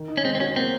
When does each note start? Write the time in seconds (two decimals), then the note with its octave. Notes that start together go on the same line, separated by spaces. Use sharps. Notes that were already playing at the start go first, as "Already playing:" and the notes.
Already playing: D#3
0.08 D#4
0.17 C#4
0.24 G#3 C4
0.35 C4
0.40 C#4 F#4
0.56 A#3 C4